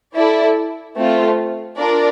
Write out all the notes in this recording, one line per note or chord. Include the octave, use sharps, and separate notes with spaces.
E4 A4 D5
A3 C4 F4
D4 F4 A#4 D5